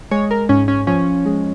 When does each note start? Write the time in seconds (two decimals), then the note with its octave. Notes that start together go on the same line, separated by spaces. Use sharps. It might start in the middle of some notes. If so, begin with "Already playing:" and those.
0.11 G#3 C#5
0.31 A#4
0.49 G#2 C#4
0.68 C#4
0.87 F3 C#4
1.26 G#3